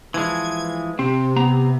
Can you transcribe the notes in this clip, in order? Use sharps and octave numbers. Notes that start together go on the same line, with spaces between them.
E3 F3 G#3 G#6
C3 C4
B3 A#5